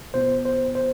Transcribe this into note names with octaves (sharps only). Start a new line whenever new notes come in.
B2 B3 F4 C5
C5
C5